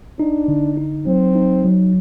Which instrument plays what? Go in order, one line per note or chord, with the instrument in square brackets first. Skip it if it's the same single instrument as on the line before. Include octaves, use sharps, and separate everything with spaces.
[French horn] D4 [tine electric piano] D#4
[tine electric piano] D3
D#4
[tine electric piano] F#3 [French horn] C4
[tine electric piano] D#4
F#3